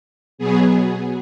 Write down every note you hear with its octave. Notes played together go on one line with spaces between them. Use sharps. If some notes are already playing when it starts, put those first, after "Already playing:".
B2 F#3 B3 G#4